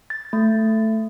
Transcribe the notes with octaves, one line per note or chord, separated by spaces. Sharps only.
A6
A3